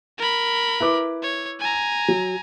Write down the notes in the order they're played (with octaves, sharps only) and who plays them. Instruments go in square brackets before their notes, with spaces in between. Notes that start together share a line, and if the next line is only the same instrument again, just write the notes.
[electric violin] A#4 B5
[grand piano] E4 B4 D6
[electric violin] C#5
G#5 A#5
[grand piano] F#3